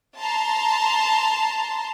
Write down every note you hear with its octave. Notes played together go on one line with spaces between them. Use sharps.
A5 A#5 C6